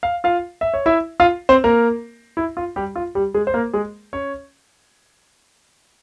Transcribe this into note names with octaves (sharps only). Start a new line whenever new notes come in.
F5
F4 F5
E5
C#5
E4 E5
F4 F5
C4 C5
A#3 A#4
E4
F4
G3 G4
F4
G3 G4
G#3 G#4
C5
A#3 A#4
G#3 G#4
C#4 C#5